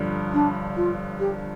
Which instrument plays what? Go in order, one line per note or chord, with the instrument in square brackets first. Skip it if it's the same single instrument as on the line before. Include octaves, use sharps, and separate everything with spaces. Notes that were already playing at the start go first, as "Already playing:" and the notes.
Already playing: [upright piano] G1 G2 D3 F3
[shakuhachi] D4
F4
G4